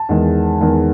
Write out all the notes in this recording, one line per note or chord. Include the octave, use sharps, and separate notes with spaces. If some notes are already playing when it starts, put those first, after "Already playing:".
Already playing: A5
E2 D#3 G#3
E2 D#3 G#3